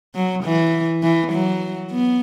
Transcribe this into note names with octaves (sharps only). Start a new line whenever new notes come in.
F#3
E3
E3
F#3
B3